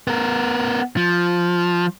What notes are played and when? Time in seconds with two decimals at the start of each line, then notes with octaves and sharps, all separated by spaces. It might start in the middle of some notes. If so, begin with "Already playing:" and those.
0.07 B3 A#4
0.97 F3